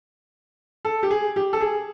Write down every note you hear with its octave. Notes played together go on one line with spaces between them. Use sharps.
A4
G4
G#4
G4
A4
G#4